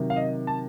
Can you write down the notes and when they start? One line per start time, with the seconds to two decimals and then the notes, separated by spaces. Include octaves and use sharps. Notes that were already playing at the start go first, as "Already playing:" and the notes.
Already playing: C3 D#3 F#3
0.10 F5
0.16 D#5
0.47 A5